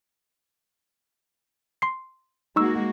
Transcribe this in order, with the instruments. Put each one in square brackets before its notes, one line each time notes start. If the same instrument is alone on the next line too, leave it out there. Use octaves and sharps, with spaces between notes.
[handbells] C6 C7
[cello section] G#3 A#3 F#4 [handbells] D#4 C#6 E6